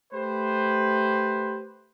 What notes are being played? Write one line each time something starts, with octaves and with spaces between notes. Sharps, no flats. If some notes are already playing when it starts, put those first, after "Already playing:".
A3 G4 B4 C5